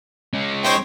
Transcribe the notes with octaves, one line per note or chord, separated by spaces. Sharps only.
G#3 C#4
D#4 C5 C#5 G5